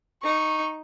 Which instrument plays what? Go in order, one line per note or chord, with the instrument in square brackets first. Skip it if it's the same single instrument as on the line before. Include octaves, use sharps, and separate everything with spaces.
[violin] D#4 [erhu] C#6